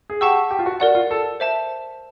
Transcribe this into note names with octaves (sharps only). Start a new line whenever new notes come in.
G#4
G4 F#5 A5 C#6 E6
G4
F4
F#4
F#4 A#4 D5 F#5
F4
A4
C5 E5 A5